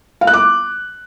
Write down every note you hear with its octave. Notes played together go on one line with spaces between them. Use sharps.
F5
F#6
D6